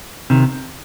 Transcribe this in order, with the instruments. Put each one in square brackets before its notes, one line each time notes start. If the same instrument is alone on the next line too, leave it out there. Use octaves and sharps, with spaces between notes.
[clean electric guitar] C3 D#3